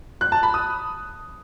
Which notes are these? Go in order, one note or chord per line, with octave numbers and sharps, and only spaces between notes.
F#6
A5
B5
D#6